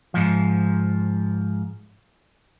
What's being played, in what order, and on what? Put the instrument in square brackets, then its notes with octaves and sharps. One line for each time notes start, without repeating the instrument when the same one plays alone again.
[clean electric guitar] G#2 F3